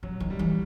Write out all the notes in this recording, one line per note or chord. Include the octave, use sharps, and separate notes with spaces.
C3 F#3
D#3
G3
E3